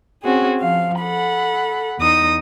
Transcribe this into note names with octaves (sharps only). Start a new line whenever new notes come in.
C4 C#4 F#4 G#4
F3 F5
A4 F#5 B5
E2 D#4 D#6 A#6